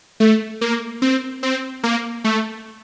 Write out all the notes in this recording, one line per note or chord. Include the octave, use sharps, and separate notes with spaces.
A3
A#3
C4
C4
A#3
A3